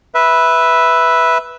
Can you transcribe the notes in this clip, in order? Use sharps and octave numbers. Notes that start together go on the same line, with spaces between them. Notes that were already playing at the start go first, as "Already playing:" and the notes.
B4 E5